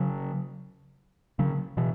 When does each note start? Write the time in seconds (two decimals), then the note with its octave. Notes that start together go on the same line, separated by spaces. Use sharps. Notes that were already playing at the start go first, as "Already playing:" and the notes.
Already playing: C#3 F#3
1.39 C#3 F#3
1.77 B2 E3